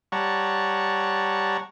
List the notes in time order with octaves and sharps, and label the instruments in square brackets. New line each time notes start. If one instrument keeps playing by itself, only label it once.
[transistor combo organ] G3 C#5 F#5 A5 A#5 C#6